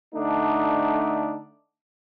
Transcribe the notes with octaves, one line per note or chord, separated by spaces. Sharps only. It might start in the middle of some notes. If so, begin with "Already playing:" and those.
D3 A3 D4 D#4